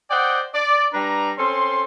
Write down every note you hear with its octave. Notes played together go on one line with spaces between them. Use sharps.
C5 D5 D#5 F#5 G5
D5
G3 D4 B4 A#5
C4 C#4 A4 C6